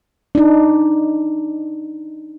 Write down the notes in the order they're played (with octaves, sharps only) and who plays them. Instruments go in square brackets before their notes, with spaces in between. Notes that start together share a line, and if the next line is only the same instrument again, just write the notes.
[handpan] D4 D#4